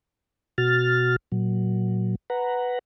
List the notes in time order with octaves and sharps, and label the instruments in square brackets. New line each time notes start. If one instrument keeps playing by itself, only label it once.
[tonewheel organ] B2 F#4 F6 A6
A#2 F#3
B4 F#5 A#5